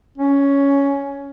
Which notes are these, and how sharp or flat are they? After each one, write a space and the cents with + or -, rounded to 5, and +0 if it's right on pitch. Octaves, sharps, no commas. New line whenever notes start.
C#4 +10